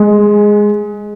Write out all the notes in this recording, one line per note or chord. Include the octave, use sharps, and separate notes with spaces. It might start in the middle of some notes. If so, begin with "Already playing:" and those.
Already playing: G#3